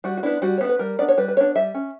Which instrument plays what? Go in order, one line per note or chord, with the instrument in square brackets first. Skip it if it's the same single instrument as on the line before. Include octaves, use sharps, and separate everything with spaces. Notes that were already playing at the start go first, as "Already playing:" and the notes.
[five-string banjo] G3 F#4
F#4
B3 D4 E4
G3 F#4
C#5
B3 D4
B4
G3 A#4
B3 D4 D5
C#5
G3 B4
B4
B3 D4 C#5
G3 E5
C#4